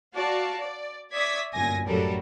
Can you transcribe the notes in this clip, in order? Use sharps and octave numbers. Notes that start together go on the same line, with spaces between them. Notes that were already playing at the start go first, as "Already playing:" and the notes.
F#4 D5 F5 A5
D5
D5 E5 C#6 D#6 G#6 B6
G1 F#2 A#2 G#5 G#6 A#6
A1 F#2 F#3 G3 A4 A#4